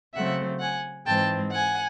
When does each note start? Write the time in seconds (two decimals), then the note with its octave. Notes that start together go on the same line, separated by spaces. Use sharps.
0.14 C#3 F#3 A3 C4 E5 F#5
0.60 F#5 G#5
1.06 G#2 E3 G#3 C4 G5 A5
1.53 F#5 G#5